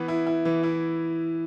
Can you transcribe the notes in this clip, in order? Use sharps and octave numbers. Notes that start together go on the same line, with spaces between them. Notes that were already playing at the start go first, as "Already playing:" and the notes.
Already playing: E3 B3
E4
E4
E3
E4